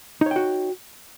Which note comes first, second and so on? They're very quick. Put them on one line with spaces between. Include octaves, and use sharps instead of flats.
D#4 C#5 G5 F#4